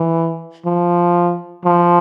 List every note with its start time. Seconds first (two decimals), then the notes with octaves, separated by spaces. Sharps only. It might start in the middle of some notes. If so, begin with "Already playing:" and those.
Already playing: E3
0.65 F3
1.65 F3